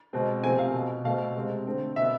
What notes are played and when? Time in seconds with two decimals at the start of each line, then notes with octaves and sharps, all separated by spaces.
0.13 B2 G#3 C4
0.44 C3 F3 A3 C4 G#5
0.59 F5
0.74 B2 B3
1.04 B2 A3 C4 F5
1.35 C3 G#3 C4
1.66 D3 A3 C4
1.96 B2 E5
2.01 B3